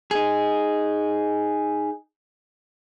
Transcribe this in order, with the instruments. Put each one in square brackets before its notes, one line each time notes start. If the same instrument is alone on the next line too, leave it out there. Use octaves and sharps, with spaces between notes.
[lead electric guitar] D#4 G#4